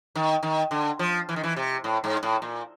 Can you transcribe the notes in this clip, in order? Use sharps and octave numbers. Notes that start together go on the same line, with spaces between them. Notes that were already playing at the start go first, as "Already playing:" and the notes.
D#3
D#3
D3
F3
E3
D#3
E3
C3
A2
G#2
A2
A#2